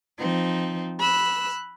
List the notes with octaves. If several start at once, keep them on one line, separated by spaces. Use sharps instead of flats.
F3 C4 D#4
B5 E6 F#6